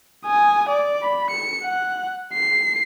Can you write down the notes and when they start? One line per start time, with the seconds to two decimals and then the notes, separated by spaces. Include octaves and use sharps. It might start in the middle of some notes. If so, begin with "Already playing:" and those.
0.25 G#5 D#6
0.70 D5
1.02 B5
1.31 C#7
1.64 F#5
2.34 C7